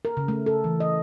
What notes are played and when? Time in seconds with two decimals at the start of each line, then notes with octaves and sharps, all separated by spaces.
0.05 A#4
0.17 C#3
0.28 A3
0.46 A4
0.64 E3
0.80 D#5